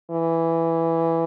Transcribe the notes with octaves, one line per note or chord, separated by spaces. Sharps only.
E3